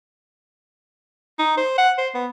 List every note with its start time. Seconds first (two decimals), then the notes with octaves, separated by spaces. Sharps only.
1.39 D#4
1.58 C5
1.78 F#5
1.98 C5
2.15 B3